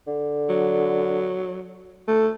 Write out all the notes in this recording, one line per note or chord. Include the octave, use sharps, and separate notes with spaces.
D3
F#3
A3 A4